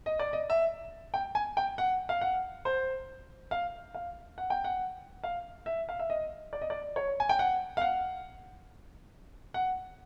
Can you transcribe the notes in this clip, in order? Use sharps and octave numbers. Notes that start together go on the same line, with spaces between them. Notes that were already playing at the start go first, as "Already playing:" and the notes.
D#5
D5
D#5
E5
G5
G#5
G5
F#5
F5
F#5
C5
F5
F5
F#5
G5
F#5
F5
E5
F5
E5
D#5
D5
D#5
D5
C#5
G#5
G5
F#5
F5
F#5
F#5